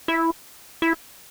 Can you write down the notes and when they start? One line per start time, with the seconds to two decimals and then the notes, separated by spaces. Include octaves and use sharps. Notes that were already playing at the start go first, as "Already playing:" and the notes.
0.08 E4
0.82 E4